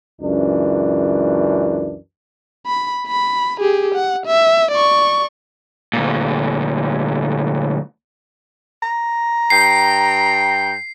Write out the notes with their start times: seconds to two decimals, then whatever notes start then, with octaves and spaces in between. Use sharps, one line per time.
0.21 C#2 F#2 E3 D4
2.67 B5
3.07 B5
3.61 G4 G#4
3.95 F#5
4.26 E5
4.72 D5 C#6
5.93 D2 A#2
8.83 A#5
9.50 G2 G5 C7